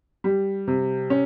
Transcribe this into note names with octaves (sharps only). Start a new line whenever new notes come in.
G3
C3
C#4